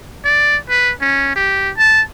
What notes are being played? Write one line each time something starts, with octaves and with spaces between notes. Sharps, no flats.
D5
B4
C#4
G4
A5